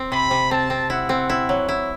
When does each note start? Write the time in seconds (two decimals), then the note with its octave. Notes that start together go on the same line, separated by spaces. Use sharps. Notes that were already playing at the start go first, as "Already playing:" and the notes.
Already playing: C4
0.11 C3 B5
0.31 C3
0.51 C4 A5
0.70 C4
0.90 E4 F#5
1.09 C4
1.29 E4
1.49 F#3
1.68 E4